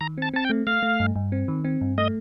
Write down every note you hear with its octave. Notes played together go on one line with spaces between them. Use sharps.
D#3 A#5
C4 A5
C4 A5
G5
A3
A3 F5
A3
G2
G2
C4
D#3
C4
G2
A3 D#5